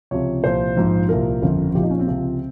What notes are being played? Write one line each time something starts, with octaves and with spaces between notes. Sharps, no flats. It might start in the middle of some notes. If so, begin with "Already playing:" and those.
C#2 C3 F3 C#5
C2 A#2 F3 C5
A#1 G#2 F3
C2 A#2 F3 A#4
G1 F2 C#3
A#1 A#2 F3 G4
D#4
C#4
C4
C#2 C3 F3